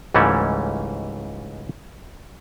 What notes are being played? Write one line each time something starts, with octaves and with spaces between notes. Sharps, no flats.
C#2 G#2 E3 G3 A3 C#4